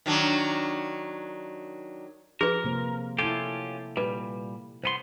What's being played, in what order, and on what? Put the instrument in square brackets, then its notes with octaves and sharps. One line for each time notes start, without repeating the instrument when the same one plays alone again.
[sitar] D#3 F#3 D4
[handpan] F3 [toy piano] G#4 B4 [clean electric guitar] A#4
[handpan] C3 A#3 C5
[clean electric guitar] C#4 F4 G4 [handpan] E4 A4
[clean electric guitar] A#2 G3 [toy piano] B4
[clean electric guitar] C2 B3 C6 [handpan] C5